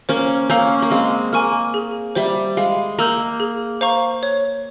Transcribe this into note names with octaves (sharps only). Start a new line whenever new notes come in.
A#3 C#4 C5
A#3 C#4 F5 A#5 E6 G6
A#3
G#3 C4 F5
A#3 G#5 C#6 F6
G#4
G3 C5 E5
G#3 F5
A#3 A#5 E6 G6
G#4
C5 F5 A#5 C#6
C#5